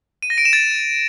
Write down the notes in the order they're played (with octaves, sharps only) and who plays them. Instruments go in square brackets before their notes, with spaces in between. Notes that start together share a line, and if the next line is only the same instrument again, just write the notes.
[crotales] D#7
A#6
D7
E7
A6